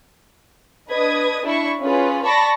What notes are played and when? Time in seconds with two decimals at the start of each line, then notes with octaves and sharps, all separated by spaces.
0.90 D4 B4 D#5 D#6 G#6
1.44 D4 E4 B5 C#6
1.81 C#4 F4 G#4 B4
2.25 D5 A5 B5 C#6 A#6